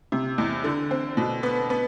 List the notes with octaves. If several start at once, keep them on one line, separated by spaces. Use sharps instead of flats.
C3
E2
D3
C4
B2
B3
B3